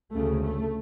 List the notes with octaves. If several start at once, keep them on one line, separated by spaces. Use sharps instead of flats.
D2 C#3 A3
A3